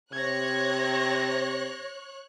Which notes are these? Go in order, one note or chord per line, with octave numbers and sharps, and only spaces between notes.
C3 C#5 F#6 G#6 A#6